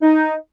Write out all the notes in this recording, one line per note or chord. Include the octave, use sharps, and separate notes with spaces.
D#4